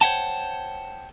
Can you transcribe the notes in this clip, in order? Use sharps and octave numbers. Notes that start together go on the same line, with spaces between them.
C5 C#5 E5 F#5 G5 A5